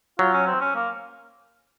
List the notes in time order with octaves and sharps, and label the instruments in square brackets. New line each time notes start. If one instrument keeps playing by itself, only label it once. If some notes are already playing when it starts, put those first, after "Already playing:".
[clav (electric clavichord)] F#3 [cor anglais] F4
[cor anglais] C#4
C4
C#4
A#3